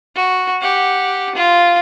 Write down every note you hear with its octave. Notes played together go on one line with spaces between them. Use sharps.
F#4
G4 F#5
F4